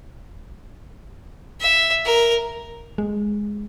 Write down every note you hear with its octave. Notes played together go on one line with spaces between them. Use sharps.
E5
A#4
G#3